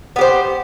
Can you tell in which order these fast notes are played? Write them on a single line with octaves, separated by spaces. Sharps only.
B3 G4 C5